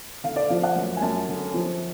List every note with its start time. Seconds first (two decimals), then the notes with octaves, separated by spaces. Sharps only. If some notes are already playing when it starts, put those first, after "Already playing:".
0.24 D3 F5
0.36 D5
0.48 F3 F5
0.63 F#5
0.76 F#2
0.97 G#5
1.01 F#2 A5
1.28 D3
1.54 F3